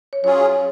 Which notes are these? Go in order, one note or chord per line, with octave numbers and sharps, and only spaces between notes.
C#5
F#3 C#4 F4 G#4 C#5